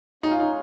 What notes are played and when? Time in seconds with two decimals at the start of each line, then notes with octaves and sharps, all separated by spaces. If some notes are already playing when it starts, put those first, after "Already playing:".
0.23 G#3 C#4 D#4 G#4 C#5 F5
0.31 F4
0.40 D#4